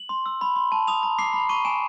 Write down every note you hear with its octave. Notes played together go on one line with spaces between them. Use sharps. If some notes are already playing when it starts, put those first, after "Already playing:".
Already playing: F#7
C6
E6
B5
C6
A5
D#6 F7
A#5
D6 C7
B5
C#6 D#7
G#5 E7